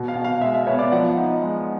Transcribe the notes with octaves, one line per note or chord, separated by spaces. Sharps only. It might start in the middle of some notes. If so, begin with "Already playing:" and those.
Already playing: B2
F5
B2
F5
G#3 E5
E5
B3 C#5
D5
F5
F3 F#5
D#4
G#3